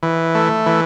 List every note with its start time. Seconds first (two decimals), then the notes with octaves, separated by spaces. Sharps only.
0.03 E3
0.35 A3
0.66 E3